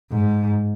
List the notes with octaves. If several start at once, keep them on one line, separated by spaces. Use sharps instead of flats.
G#2